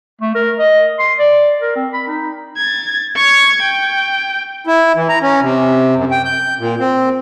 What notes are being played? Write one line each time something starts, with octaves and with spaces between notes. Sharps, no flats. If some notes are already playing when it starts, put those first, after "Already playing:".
A3
A#4
D#5
C6
D5
A#4
C4
B5
D#4
G#6 A6
C#6 G#6
G5
E4
E3
A#5
C#4
C3
F#2
G5
G6
A#2
C4